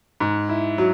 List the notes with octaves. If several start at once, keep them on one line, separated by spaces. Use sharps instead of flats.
G#2
E4
F#3